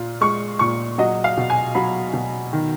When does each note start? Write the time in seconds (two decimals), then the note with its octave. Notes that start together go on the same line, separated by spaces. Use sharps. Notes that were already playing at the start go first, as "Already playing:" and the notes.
Already playing: A#2 F4
0.21 G#3 C#6
0.59 A#2 C#6
0.98 F#3 D#5
1.24 F5
1.37 B2
1.50 G#5
1.75 F#3 B5
2.13 B2
2.53 D#3